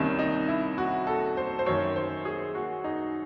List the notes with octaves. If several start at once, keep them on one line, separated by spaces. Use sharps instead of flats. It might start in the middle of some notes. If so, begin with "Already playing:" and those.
Already playing: C2 C3 D#3 C#4
D#4
E4
F#4
A4
C5
C5
F#2 D#3 C#5
C5
G#4
F#4
D#4